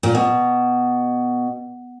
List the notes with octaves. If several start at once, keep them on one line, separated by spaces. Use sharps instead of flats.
A#2
B2